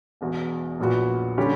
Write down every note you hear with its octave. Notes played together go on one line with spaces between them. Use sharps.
E1 E2 B2
A#1 A#2 F#3 B3 F#4
D3 G3 C#4 G4